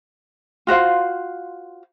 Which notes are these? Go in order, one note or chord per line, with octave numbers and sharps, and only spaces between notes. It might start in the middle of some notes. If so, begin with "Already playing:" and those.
F4 F#4 C5 F5